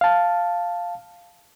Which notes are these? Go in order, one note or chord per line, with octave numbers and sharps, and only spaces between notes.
F5 A5